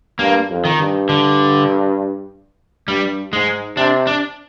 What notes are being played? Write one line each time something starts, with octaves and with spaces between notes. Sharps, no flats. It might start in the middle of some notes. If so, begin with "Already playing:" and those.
G2 A#3
F2
D#3
G2
D3
G2 G3
G#2 G#3
C3 D4
D4